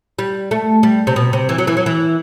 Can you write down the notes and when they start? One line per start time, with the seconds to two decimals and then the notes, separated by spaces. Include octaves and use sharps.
0.19 G3
0.51 A3
0.83 G3
1.07 C3
1.16 B2
1.33 C3
1.49 E3
1.58 F#3
1.67 E3
1.77 F#3
1.86 E3